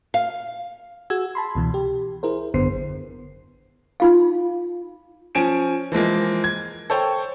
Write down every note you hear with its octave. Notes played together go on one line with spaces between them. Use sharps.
F5
F#4 G#4 E6 G#6
A5 B5 C6
C#2 B2 E3
G4
E4 G#4 A#4 C5
G#1 F#2 D3 B3 C5 C7
D#4 F4 F5
F3 C#4 G#5 D7 E7
E3 F3 G#3 A#3
G#6
A4 C5 C#5 G5